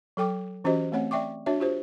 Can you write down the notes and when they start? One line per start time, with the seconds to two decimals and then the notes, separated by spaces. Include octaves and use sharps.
0.17 F#3 A4 G5 D6
0.64 E3 C#4 F#4 G4 C5 D#5
0.92 A3 C4 C#5 F#5
1.11 D5 E5 G5 C#6 D6
1.46 D4 F#4 C#5 E5
1.60 F4 G4 C5